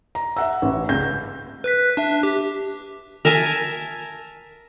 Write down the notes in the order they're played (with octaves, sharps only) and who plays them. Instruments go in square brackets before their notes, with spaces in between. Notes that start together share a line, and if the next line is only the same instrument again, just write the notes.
[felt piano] A#5
E5 F#5 E6
A1
C#2 G6
[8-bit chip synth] B4 F#6 B6
D4 E5
G4
[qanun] A#4 E5 G#5 A5